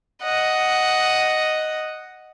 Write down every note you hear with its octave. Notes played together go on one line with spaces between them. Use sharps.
D#5 F#5